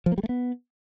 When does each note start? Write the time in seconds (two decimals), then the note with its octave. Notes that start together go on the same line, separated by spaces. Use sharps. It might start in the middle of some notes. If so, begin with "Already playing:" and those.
0.06 F3
0.12 A#3
0.18 G3
0.23 A3
0.29 B3